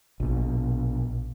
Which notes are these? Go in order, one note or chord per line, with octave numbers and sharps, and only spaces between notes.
A#1 B2